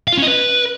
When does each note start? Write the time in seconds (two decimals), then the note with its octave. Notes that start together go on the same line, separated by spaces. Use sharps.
0.08 F5
0.13 F4
0.18 C#4
0.23 D#5
0.28 B4